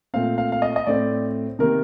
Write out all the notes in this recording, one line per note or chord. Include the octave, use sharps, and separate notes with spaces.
A#2 A3 C4 F5
F5
F5
D#5
D#5
A2 A3 C4 D5
C3 D#3 A#3 A#4